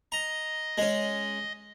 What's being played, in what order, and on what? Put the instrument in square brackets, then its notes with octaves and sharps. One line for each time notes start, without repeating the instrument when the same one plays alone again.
[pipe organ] D#5 [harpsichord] A#5
[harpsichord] G#3 C#4